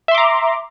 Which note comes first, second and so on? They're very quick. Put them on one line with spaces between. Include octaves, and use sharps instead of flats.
E5 C6 D6 A#5